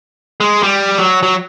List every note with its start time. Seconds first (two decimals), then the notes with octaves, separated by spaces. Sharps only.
0.40 G#3
0.63 G3
0.98 F#3
1.23 F#3